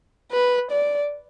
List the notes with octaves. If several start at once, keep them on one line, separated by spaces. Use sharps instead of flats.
B4
D5